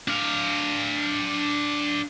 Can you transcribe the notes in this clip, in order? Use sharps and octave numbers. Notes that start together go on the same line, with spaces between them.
D4 F5